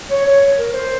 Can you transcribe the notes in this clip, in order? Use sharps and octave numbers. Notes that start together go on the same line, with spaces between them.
C#5
C#5
A#4
C5